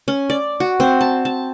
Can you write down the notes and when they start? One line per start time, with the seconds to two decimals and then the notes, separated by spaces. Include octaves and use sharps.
0.08 C#4
0.30 D5
0.60 F#4
0.80 C4
1.01 A5
1.25 A5